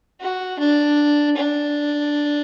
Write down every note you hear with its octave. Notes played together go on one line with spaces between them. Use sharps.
F#4
D4
D4